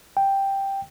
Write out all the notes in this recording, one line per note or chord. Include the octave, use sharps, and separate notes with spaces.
G5